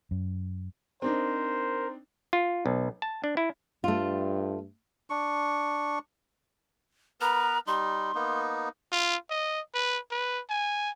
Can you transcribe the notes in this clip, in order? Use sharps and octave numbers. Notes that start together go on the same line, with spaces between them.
F#2
C4 D4 D#4 A#4 C5
F4
B1
A5
D4
E4
G2 A3 F4
D4 C#6
B3 A#4 B4 A#5
G3 D#4 C6
A#3 B3 D#4
F4
D#5
B4
B4
G#5